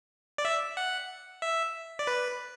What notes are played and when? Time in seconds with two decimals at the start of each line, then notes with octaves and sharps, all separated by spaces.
0.38 D5
0.45 E5
0.77 F#5
1.42 E5
1.99 D5
2.07 B4